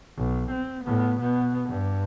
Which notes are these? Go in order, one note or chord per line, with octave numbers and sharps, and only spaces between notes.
B1
C4
A2 B3
B2 B3
G2